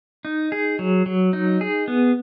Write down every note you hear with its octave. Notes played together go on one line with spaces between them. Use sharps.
D#4
G#4
F#3
F#3
D#4
G#4
B3